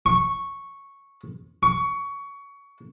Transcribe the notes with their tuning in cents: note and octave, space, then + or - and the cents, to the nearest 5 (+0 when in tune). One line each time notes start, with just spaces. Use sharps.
C#6 -5
C#6 +20